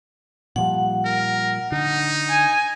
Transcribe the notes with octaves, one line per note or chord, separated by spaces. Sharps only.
A#2 F3 G3 F#5
A#4
D3 D#4
G#5